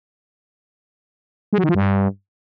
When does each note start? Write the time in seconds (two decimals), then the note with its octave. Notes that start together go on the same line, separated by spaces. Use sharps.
1.53 G#3
1.58 F#3
1.64 D#3
1.69 F3
1.75 G2